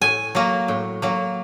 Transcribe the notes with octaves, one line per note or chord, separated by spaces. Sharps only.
A2 G#5
F#3 A#3
A2
F#3 A#3